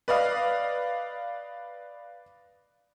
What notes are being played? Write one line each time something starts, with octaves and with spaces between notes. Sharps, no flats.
B4 D5 D#5 F5